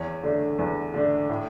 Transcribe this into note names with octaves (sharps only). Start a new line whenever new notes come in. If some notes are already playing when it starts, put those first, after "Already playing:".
Already playing: E2 C#5
D3 A3 D4
E2 B4
D3 A3 D4
A2